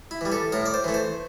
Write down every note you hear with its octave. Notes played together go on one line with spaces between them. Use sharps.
E4
E3 G3
A4
A2 A#4
D5
C5
E3 A3
C5